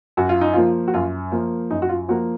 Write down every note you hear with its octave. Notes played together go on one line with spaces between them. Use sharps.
F#2 F#4
F4
D#4
F3 A#3 F4
F#4
F#2 F4
F3 A#3
F#2 D#4
F#4
F4
F3 A#3 F#4